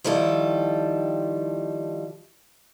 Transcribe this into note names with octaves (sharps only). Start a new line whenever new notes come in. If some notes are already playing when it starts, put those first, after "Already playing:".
D#3 F3 G3 E4 A4